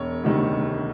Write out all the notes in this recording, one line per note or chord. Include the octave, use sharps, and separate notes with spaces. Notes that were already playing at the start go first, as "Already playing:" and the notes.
Already playing: E1 C#5
D2 C3 D#3 G3